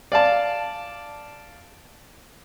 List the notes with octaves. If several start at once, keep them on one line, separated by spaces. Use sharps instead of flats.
D5 F5 A5